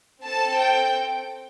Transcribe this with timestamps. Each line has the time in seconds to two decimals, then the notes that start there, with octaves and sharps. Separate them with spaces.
0.24 C4 A4 A5
0.58 G5